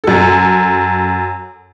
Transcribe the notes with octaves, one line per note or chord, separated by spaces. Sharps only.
F#2 A4